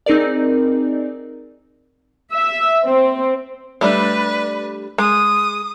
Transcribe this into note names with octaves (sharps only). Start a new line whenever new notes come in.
C4 D#4 G#4 A#4 D5
E5
C4
G3 A3 D4 B4
G#3 D#6